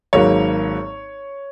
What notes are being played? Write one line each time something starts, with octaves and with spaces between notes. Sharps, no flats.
G#1 G#2 F#3 A#3 C#5